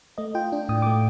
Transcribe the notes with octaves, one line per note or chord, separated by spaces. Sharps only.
A3 D#5
F4 G5
D4
A2 D#6
D6
A3